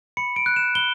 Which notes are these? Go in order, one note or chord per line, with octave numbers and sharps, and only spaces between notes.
B5 C#7
D7
F#6
E7
B5 G7